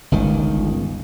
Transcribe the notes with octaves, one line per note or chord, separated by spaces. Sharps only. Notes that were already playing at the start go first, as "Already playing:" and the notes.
G1 C#2 D#3